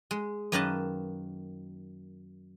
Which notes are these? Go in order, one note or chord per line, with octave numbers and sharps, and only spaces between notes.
G#3
F#2 D#3 A#3 B4 D#5 A5